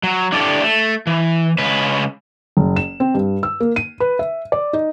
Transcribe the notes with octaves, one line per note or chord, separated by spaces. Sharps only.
F#3
D4 E4 G4 A4 C5 D5
A3
E3
C#3 G#3 B4
F#1
E7
C4
G2
E6
A#3
D#7
B4
E5
D5
D#4